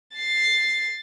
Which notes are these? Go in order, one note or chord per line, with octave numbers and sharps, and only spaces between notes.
A6 C7